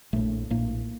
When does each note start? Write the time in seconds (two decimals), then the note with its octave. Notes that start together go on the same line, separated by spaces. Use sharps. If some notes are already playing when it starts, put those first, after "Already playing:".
0.13 A#1 A2 A3
0.50 A#1 A2 A#3